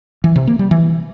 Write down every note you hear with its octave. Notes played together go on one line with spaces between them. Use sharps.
E3
C3
A#3
G3
E3